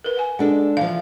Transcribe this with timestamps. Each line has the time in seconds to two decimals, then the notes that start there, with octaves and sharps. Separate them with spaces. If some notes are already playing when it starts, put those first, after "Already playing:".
0.04 A#4 B4
0.17 F#5 G#5
0.39 G#3 D4 A4 F#5
0.77 E3 F3 F5